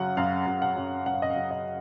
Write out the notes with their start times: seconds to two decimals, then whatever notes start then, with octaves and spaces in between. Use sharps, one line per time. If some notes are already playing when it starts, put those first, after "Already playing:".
Already playing: F#2 C#3 F#3 F#5
0.17 F#2 F5
0.47 F#2
0.62 F#5
0.76 F#2
1.06 F#2 F#5
1.14 F5
1.22 D#5
1.30 F5
1.36 F#2
1.51 D#5